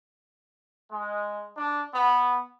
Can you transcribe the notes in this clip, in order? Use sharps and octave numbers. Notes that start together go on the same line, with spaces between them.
G#3
D4
B3